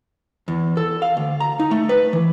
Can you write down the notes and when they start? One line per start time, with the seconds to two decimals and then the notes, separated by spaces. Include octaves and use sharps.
0.48 E2
0.77 A4
1.02 F5
1.17 D2
1.40 A#5
1.60 D#4
1.71 A3
1.89 B4
2.13 E3